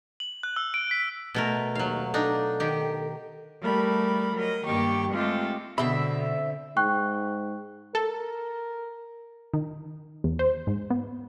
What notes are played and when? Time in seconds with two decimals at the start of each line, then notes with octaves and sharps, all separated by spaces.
0.20 F#7
0.43 F#6
0.56 E6
0.74 D7
0.91 B6
1.34 B2 A3 A#4
1.75 D#2 F#3 F5
2.14 D4 D#4 A4
2.60 D#3 G4
3.62 G3 A3 A#4 B5
4.35 F#3 A#4 D#5
4.64 G2 D#3 A#3 G4 C#6 D6
5.13 G#3 A3 C4 F4 G4 A4
5.78 B2 D3 C4 E5 B5
6.77 G#2 G5 C#6 F#6
7.95 A4 A#4
9.54 D#3
10.24 E2
10.39 C5
10.67 G#2
10.90 B3